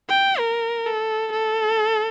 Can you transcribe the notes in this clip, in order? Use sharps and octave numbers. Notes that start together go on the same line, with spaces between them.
G5
A#4
A4
A4